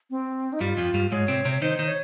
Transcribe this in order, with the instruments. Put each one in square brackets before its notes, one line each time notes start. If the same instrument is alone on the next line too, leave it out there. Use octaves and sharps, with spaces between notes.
[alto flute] C4
D#4
[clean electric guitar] G2 G3 [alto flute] F4
[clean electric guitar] F2 F3
G2 G3
[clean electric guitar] G#2 G#3 [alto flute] C#5
[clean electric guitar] C3 C4
C3 C4
[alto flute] C#5
[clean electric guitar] D#3 D#4 [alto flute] C5
[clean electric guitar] D#3 D#4
[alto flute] C#5